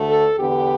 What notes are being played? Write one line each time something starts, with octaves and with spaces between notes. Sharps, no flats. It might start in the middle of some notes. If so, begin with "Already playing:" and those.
Already playing: D2 D3 A3
A4
E2 D3 B3 G4